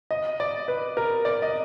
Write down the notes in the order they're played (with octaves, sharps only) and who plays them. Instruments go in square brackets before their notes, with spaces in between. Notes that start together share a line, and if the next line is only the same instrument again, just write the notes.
[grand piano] D#5
D5
B4
A#4
D5
D#5